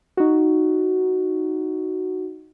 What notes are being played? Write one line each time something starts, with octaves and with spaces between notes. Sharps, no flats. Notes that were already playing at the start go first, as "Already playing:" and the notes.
D#4 F#4